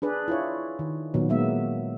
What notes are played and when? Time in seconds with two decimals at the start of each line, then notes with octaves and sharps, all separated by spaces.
0.02 D4 G#4 B4 D5
0.28 E4 F4 C#5
0.79 D#3
1.14 A#2 D#3 F#3 B3
1.29 F#3 G#3 A#3 B3 E5